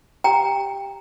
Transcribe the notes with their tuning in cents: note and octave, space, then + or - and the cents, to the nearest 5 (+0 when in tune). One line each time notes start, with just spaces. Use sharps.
G4 +0 G5 +15 A#5 -5